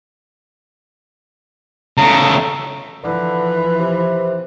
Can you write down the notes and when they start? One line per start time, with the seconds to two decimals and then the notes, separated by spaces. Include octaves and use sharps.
1.97 C#3 A3 A#5
3.03 D3 E3 F3 B4
3.79 C3